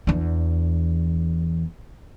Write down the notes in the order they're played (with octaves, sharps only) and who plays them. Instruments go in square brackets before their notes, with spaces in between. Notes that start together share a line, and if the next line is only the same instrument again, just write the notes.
[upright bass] E2 D4